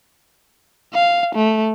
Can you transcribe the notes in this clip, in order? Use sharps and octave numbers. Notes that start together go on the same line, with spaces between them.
F5
A3